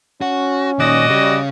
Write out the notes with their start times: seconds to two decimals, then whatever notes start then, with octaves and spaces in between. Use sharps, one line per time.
0.22 C#4 F#4
0.79 A#2 D#3 F#4 D5 D#5
1.09 C#3 G3